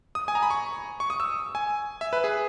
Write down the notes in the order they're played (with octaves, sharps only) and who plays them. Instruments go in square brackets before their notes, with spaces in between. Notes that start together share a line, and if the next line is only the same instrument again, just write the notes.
[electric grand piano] D#6
G#5
A#5
B5
C#6
C#6
D#6
E6
G#5
E5
B4
G#4